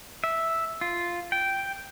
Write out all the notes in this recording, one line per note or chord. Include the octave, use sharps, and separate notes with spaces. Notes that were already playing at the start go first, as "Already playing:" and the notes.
E5
F4
G5